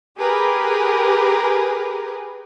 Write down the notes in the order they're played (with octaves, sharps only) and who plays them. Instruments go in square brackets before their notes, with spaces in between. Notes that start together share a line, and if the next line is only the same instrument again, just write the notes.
[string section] G4 G#4 A#4 B4